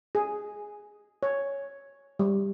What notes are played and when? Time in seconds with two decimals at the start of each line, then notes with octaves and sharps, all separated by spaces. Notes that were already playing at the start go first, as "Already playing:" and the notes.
0.15 G#4
1.23 C#5
2.19 G3